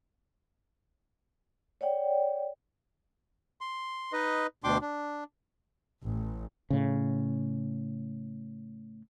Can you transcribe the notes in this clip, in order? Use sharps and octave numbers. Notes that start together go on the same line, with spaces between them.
C#5 D5 F#5 G5
C6
D#4 B4 D#5
D2 B2 D4 G5 C6 D6
D4
A1
A2 C#3